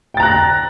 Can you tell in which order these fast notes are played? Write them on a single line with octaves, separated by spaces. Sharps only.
G5 A6 A#5 F#6 A#6